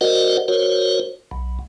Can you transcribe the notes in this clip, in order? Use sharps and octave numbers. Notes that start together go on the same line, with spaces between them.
F#4 A#4 C5 D5 D#5 F#5
F#4 A#4 C5 C#5
B1